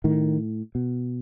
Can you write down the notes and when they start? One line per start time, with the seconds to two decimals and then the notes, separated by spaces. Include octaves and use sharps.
0.04 A2 D#3
0.75 B2